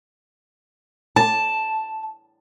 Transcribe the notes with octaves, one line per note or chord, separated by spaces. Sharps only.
A5